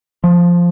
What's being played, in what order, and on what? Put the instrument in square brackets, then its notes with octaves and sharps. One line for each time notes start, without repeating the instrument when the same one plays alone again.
[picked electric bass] F3